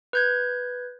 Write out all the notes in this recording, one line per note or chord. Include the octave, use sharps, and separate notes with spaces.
B4 G6 G#6